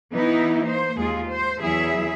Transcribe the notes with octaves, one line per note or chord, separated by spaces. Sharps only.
E3 B3 D#4 E4
A#3 C5
D#2 G#3 F4 G#4
C5
E2 F#3 E4 G#4 E5